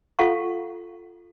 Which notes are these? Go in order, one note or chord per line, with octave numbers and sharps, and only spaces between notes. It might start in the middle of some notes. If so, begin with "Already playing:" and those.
F4 A4 F5 F#5 C#6